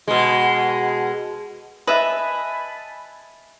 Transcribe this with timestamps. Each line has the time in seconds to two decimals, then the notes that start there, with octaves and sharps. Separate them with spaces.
0.07 B2 G#3
1.87 B4 D#5 E5 G#5 A5 B5